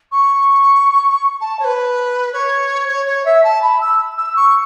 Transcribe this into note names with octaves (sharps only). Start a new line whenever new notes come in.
C#6
A5
C#5
B4
C#5
C#5
C#5
E5
A5
B5
E6
E6
C#6